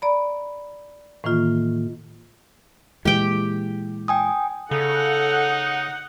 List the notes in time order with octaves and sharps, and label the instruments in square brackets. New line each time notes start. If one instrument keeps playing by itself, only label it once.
[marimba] D5 A#5 B5
A2 D#3 E3 A#3 F4
[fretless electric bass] A#2 E3 G#3 [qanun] G4 G5
[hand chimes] G5 G#5 D#6
[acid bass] C#3 [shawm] D#4 [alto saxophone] A4 [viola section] F#5